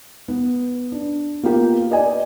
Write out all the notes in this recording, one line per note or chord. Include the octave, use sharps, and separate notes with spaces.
B3
D4
A#3 B3 F4 G4 A#4
B4 D5 D#5 G#5